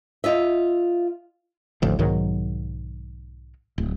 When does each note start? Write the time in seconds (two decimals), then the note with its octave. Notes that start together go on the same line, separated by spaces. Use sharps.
0.24 F4 D#5 E5
1.82 G#1 D2 A2 F3
1.99 B1 G#2 D#3 F#3
3.78 D1